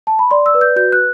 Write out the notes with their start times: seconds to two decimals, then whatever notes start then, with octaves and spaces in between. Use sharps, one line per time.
0.07 A5
0.19 B5
0.31 D5 C6
0.46 E6
0.55 B4
0.61 G6
0.76 F#4 G6
0.92 F#6